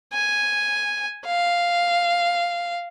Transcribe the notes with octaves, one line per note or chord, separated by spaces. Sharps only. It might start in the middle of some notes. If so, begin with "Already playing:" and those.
G#5
F5